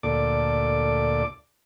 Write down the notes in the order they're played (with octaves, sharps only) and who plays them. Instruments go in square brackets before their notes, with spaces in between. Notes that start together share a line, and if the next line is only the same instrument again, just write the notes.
[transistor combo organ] D2 A#2 A4 D5 D6